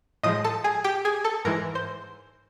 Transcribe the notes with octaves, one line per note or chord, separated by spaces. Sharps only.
A2 F3 G#3 D#5 D#6
A4 A5
G#4 G#5
G4 G5
G#4 G#5
A4 A5
G#2 E3 G#3 A#4 A#5
C5 C6